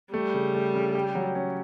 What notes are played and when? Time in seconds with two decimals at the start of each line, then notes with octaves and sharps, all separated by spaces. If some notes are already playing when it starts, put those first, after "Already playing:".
0.14 G3 A3
0.34 C#3
0.54 A3
0.75 C#3
0.95 G4
1.15 F#3
1.35 C#4